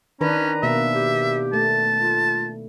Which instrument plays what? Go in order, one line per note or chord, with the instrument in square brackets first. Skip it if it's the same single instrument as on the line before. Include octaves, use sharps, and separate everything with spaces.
[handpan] D#3 D4 B4 [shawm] C#4 [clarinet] A#5
[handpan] B2 A#3 [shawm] E5
[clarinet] G4
[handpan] A3 [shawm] A5
[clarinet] F4